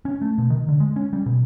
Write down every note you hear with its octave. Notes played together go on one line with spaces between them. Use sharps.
C#4
A3
B2
D#3
D3
G#3
C#4
G3
B2